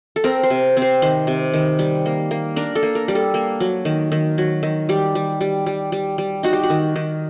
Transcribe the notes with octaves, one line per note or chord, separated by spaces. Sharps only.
A4
C4 A#4
C5
C3
C4
C5
D#3 C5
C3
D#3
G3
A#3
A#3
D4 A#4
A4
A#3
A#4
G3
A4
A#3
F#3
D#3
D#3
F#3
D#3
G3 G4
G3
G3
G3
G3
G3
D#4 F#4
G4
F#4
D#3
D#3